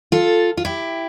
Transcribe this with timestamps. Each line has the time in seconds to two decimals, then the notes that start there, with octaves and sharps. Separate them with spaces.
0.12 F4 A4
0.57 F4
0.65 E4 G4